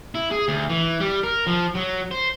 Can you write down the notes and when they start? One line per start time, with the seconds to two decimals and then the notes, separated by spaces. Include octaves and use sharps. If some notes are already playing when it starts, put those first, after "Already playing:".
0.15 E4
0.31 G#4
0.48 D2
0.70 E3
1.00 G3
1.23 A#4
1.47 F3
1.75 F#3
2.11 C5